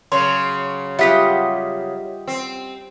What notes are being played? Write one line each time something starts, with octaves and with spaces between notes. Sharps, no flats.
C#3 F#3 C#5 C6
G3 F4 G4 D#5 E5 F#5 B6
C4